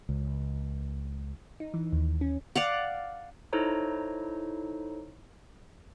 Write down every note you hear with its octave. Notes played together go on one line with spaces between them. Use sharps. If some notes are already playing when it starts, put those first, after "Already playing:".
C#2
D#4
E3
D#2
C#4
D5 F5 F#5
D#4 E4 A4 C5 C#5 A#5